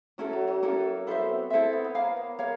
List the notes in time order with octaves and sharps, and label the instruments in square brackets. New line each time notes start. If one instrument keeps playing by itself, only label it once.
[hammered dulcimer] F#3 [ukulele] C#4 E4 A4
[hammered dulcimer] F#3
F#3
[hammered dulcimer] A#3 [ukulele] C#4 E4 A4
[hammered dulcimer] B3 [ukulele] E4 A4 C5 E5
[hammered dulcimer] C4
[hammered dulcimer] C4 [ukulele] E4 A4 C5 E5
[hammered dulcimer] B3
B3
[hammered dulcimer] A#3 [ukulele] A#4 C#5 F5
[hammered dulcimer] B3
[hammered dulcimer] A#3 [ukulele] A#4 C#5 F5